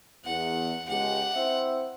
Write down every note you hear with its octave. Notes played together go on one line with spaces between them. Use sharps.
E2 F#5
C#2 G#3 G4 F#5
C4 E4 E5